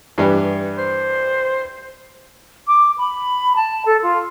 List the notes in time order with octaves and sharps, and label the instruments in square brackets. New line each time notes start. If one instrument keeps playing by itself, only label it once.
[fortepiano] G2 E3 G3
[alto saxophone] C5
[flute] D6
B5
A5
A4
F4